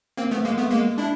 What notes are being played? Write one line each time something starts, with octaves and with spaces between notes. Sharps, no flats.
A#3 C4
A3 B3
G#3 A#3
A3 B3
G#3 A#3
D4 E4